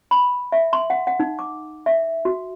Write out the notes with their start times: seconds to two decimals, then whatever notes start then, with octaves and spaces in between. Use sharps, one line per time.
0.11 B5
0.52 E5
0.73 C6
0.90 F#5
1.07 F#5
1.20 D#4
1.39 D6
1.86 E5
2.25 F#4